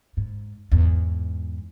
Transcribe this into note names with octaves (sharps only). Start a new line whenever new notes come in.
G#2
E2 G#2